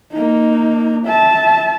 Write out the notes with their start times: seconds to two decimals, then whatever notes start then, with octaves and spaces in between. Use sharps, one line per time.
0.12 A#3 D#4
1.06 E5 A5